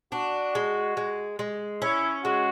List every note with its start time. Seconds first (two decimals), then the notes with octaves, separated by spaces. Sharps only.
0.12 D4 F#4
0.55 G#3
0.97 G#3
1.39 G#3
1.82 C#4 E4
2.24 G#3 F#4